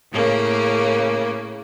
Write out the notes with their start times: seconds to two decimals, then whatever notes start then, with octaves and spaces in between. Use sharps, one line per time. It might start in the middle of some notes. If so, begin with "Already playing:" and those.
0.11 A2 C#3 A#3